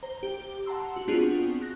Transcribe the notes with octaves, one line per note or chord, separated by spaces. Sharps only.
C5 A#5
G4
F#5 A5 A#5 C6 E6
F#4
B3 C4 D4 F4 F#4 G#4
F#6 A#6